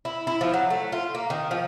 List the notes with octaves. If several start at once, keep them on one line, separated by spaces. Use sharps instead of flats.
E4
E4
F3
F#3
A3
F4
A#3
D#3
F3